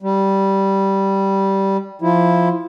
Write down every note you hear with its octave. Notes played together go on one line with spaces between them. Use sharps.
G3
F3 E4